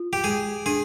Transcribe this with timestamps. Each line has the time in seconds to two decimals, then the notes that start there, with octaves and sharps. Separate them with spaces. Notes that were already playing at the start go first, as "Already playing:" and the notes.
Already playing: F4
0.13 G4
0.24 G#3 G#4
0.66 D4 G#4